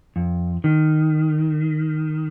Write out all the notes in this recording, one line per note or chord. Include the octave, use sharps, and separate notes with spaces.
F2
D#3